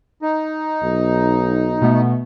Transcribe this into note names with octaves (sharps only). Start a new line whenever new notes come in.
D#4
B1
B2 A3 B3